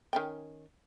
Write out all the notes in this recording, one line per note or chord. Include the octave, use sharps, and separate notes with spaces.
D#3 C#4 G5